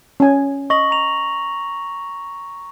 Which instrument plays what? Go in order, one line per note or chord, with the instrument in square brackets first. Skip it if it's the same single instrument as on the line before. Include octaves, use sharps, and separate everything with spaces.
[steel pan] C#4 G#5
[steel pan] D#5 [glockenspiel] C#6 A#6 F#7
[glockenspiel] A#5 F7